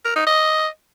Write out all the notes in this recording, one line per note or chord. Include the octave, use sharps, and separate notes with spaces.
A#4
D#4
D#5